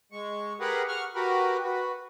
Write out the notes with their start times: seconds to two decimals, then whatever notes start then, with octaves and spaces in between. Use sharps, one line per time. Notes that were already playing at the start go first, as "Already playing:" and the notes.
0.12 G#3 C#6
0.60 G4 G#4 A#4 B4 F#5
0.88 F#5 C#6 F6
1.15 F#4 G4 A#4 B4
1.64 F#4 B4